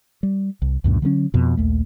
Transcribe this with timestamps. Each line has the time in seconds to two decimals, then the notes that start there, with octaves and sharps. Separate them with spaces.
0.23 G3
0.62 C2
0.84 C#2 F#2 A#2 D3
1.02 D3 F#3 G3 C#4
1.34 F2 B2
1.57 A#1 D#2 A3